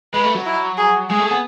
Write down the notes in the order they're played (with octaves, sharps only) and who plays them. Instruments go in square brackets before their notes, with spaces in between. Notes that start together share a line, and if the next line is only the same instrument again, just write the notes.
[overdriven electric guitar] G#3 [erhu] B4
[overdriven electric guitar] A3
F#3
[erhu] E4
G#4
[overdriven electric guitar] G#3 [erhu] G#4
[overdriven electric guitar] A3
B3